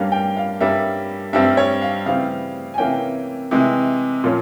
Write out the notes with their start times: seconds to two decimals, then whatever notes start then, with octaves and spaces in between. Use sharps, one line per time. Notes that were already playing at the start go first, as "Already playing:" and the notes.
Already playing: G2 G3 A#3 C#4 F5
0.12 G5
0.37 F5
0.60 G2 G3 A#3 C#4 E5
1.33 G2 G3 C4 E5
1.57 C#5
1.81 F5
2.06 C#3 E3 G3 C4 F5
2.74 G#5
2.78 C3 E3 A#3 C#4 G5
3.51 C3 E3 G#3
4.24 A#2 F3 A#3 C#4